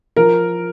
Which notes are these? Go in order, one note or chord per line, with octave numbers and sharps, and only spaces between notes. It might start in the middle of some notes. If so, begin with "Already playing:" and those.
F3 A#4